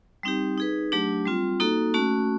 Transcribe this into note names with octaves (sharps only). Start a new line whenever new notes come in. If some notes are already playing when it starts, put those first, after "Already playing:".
G3 C4 D#4 G4
D#4 G#4 B4
F#3 A3 D4 G4
G3 C4 F4
A#3 D#4 F#4 A4
A3 C#4 F#4